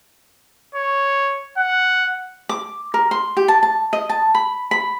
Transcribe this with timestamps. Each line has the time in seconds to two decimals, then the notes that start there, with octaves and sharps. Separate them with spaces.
0.75 C#5
1.58 F#5
2.49 D6
2.94 A#4
3.11 C6
3.37 G4
3.48 A5
3.63 A5
3.93 D#5
4.09 A5
4.35 B5
4.71 B5